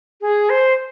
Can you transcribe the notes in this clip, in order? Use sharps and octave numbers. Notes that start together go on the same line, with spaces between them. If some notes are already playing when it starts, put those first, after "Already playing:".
G#4
C5